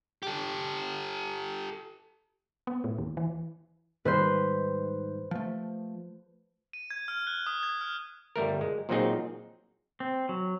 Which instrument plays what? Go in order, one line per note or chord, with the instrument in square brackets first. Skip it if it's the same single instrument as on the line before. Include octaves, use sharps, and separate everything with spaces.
[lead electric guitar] G4 A4
[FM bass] B3
A2
D#2
E3
[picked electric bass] G#2 D#3 G3 [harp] B4 C5
[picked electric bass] F3 A3
[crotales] D#7
G#6
F6
F#6
D#6
G#6
F6
[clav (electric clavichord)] G1 G3 A3 A#4
G#3
A#2 F3 F#3 C4 D#4 G#4
[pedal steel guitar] C4
F#3